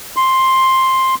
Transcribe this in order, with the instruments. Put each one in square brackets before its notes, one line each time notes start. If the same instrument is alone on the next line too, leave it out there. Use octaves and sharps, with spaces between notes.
[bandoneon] C6